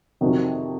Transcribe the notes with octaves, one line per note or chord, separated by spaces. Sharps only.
F2 C3 D#3 F#3